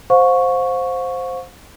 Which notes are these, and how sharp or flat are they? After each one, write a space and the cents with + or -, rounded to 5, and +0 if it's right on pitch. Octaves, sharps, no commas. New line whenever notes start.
C5 +0 F5 +40 C#6 +0